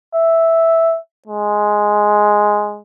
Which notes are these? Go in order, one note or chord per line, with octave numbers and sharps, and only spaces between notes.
E5
G#3